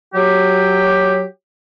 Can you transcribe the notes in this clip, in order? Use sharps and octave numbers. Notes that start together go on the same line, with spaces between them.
F#3 G4